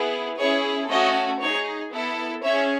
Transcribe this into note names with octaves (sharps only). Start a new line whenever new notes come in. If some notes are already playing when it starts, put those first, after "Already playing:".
Already playing: B3 E4 G#4
C#4 E4 G#4 C#5
A3 C#4 F#4 A4 D#5
D#4 G#4 C#5
B3 E4 A4
C#4 G#4 C#5 E5